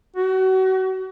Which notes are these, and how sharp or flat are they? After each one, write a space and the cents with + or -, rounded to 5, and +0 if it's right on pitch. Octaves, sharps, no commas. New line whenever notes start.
F#4 +30